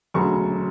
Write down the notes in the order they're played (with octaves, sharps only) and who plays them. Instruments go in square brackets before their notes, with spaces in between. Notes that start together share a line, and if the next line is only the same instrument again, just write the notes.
[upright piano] E1 D2 C#3 F#3 C#6